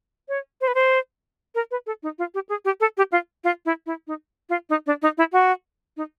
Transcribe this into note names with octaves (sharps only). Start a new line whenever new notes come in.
C#5
C5
B4
C5
A#4
B4
A4
D#4
F4
G4
G#4
G4
A4
G4
F4
F4
E4
E4
D#4
F4
D#4
D4
D#4
E4
F#4
D#4